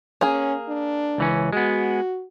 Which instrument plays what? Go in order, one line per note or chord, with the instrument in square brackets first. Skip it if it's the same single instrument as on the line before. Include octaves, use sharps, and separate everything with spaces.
[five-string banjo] A#3 G#4 [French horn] C#4
[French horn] D4
[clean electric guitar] C#2 E3 C#4
[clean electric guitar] G#3 B3 [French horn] F#4